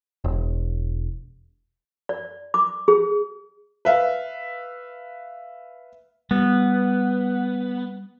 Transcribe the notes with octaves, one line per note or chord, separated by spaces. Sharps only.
E1
D5
D6
G#4
B4 E5 F5
G3 B3